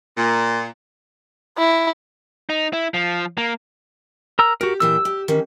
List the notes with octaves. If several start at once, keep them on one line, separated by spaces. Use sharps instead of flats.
A#2
E4
D#4
E4
F3
A#3
A#4 A#5 E6
F#4 G4 A#4
A#2 E3 G5 E6
G4
D#3 E3 C#4